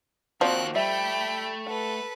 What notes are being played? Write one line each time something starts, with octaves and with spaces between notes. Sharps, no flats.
D#2 D#3 F3 C4 F#4 D5 F#6
G3 A3 E5 G5 B5
A4 B4 F#5